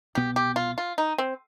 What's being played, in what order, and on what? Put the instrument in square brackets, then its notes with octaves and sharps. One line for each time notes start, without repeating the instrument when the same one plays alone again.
[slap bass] C2 B2 B3 [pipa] G4
[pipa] G4
F4
F4
D#4
C4